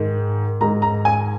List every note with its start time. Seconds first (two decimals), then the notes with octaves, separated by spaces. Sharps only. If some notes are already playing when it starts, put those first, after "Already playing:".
Already playing: G#2 D#3 G#3
0.60 G#2 D#3 G#3 A#5
0.82 A#5
1.05 G#5